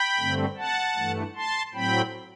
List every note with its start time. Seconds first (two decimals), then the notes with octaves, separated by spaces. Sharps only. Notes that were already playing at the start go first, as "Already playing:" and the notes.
Already playing: G5 B5
0.18 G2 D3 A3 C4
0.57 F#5 A5
0.96 G2 E3 A3
1.35 A5 C6
1.74 A2 F#3 C4 G5 B5